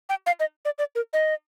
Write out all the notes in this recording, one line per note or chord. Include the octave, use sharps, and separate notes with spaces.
G5
F5
D#5
D5
D5
A#4
D#5